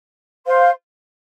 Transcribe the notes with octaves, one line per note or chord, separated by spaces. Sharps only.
C5 F5 C6